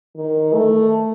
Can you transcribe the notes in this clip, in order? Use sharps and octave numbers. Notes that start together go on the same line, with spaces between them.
D#3
A3